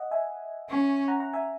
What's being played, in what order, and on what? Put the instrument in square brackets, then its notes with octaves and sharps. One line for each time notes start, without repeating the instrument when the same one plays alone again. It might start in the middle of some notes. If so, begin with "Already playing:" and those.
Already playing: [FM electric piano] D#5 F#5
E5 G#5
[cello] C#4
[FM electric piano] F#5 A#5
F#5 A#5
E5 G#5